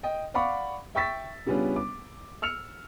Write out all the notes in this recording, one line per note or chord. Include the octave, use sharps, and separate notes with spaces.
D#5 G5
D5 F5 F#5 B5 C#6 D6
E5 G5 C#6 E6 A6 B6
C#3 G3 B3 C#4 D4 F4
D6
E6 F6 C#7 F7